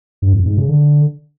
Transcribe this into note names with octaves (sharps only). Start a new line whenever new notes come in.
G2
F2
G#2
C#3
D3